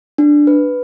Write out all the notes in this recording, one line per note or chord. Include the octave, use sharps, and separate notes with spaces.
D4
B4